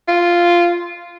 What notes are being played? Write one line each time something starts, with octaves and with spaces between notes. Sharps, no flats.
F4